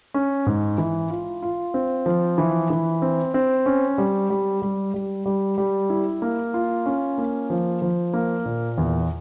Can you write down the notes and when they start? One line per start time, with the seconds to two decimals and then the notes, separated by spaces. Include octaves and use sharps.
0.14 C#4
0.46 G#2
0.78 E3
1.10 F4
1.42 F4
1.74 C4
2.06 F3
2.38 E3
2.70 E3
3.02 C4
3.34 C4
3.66 C#4
3.98 G3
4.30 G3
4.62 G3
4.94 G3
5.26 G3
5.58 G3
5.90 E4
6.22 A#3
6.54 F4
6.86 C#4
7.18 A#3
7.50 F3
7.82 F3
8.13 A#3
8.46 A#2
8.78 E2